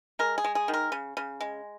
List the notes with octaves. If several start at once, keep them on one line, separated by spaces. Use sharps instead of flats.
G#3 A#4
G#4
G#3
G#4
D#3
A#4
C#3
C#3
G#3